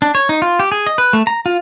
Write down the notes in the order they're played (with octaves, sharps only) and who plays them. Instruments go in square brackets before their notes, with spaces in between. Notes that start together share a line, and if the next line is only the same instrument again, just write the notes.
[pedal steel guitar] D4
C#5
D#4
F4
G4
G#4
D#5
B4
A3
A#5
F4